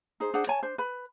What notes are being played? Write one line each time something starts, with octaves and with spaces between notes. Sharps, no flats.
D#4 G#4 C5
D4 G#4 C5 F#5
C#5 G#5 A5
D4 C5
B4 B5